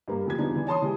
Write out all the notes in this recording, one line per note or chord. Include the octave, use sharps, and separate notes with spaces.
G2 A#3
F1 F3 G4 G#6
E2 F3 B3 D4 D#4
E3
C#5 A5 C6 D#6
E3 G3 G#3